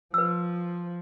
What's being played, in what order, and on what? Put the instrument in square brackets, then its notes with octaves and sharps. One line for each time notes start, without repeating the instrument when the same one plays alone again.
[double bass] F3 [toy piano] B4 E6